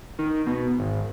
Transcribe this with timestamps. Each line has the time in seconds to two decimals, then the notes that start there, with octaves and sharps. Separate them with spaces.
0.19 D#3
0.47 B2
0.78 G#1